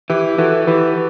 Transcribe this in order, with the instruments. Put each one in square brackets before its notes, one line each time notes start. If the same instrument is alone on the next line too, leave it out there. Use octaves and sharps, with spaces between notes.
[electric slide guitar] E3 [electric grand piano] E4 G4
[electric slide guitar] E3 [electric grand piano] F#4 A4
[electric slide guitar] E3 [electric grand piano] G4 B4